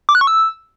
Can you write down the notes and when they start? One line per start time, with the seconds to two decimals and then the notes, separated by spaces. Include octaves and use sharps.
0.09 D6
0.15 F#6
0.21 C#6
0.27 E6